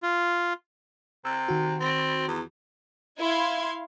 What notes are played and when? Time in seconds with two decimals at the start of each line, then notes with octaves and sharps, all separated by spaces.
0.03 F4
1.25 C3 E6
1.48 D#3 F#4
1.80 C4
2.28 E2
3.19 E4 F5 C6 G#6